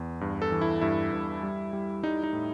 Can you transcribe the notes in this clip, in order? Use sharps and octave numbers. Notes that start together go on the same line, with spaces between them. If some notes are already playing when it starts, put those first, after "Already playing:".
Already playing: E2
G2
A4
E3
E4
G2 E4
G2
G3
G3
G3 D#4
D#4
A2